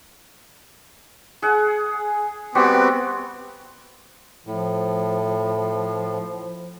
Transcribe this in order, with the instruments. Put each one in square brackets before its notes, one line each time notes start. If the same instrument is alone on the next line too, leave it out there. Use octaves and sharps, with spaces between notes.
[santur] G#4 F#5
[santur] G3 F#4 G4 [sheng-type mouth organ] B3 C4
[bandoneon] A2 [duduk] F3